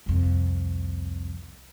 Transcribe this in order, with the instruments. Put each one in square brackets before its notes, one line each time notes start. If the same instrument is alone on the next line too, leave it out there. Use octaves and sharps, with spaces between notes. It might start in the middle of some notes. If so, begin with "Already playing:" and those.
[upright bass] C2 F2